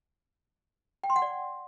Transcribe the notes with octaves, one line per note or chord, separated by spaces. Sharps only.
G5
C6
F#5
D5